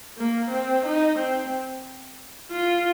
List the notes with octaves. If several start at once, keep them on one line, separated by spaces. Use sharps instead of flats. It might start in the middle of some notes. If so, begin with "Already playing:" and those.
A#3
C4
D#4
C4
F4